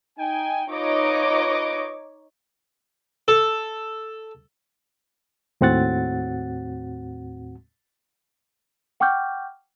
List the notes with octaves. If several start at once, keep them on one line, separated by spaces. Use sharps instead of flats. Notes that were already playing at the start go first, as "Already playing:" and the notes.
D#4 G5 G#5
D#4 F4 B4 C#5 D#5 D6
A4
D#2 A2 C4 F#4 F#5 A6
F#5 G5 C#6 D6 F6 G6